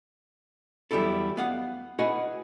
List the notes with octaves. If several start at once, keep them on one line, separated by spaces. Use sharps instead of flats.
E2 F#3 G3 B3 E4 A4
B3 F5 F#5
E4 F#4 G#4 B4 D#5 F#5